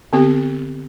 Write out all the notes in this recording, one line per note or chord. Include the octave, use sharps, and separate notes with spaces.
D3 B3 C4 G4